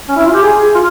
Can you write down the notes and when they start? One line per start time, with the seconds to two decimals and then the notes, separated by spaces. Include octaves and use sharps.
0.09 C#4
0.16 E4
0.25 F4
0.33 G4
0.42 G#4
0.75 F4